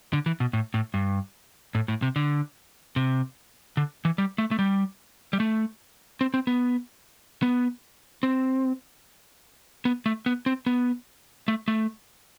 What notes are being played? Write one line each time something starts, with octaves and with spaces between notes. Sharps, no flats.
D3
E3
B2
A2
A2
G2
A2
A2
C3
D3
C3
D3
E3
G3
A3
A3
G3
G3
A3
C4
C4
B3
B3
C4
B3
A3
B3
C4
B3
A3
A3